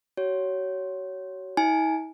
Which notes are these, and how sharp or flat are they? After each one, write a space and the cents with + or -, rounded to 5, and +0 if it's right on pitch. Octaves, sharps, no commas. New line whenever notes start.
F#4 +35 C#5 +10
E4 -45 G#5 +0